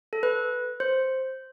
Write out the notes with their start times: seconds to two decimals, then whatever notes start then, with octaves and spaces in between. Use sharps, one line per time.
0.13 A4
0.23 B4
0.80 C5